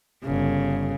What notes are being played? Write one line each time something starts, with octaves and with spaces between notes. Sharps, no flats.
G1 C#3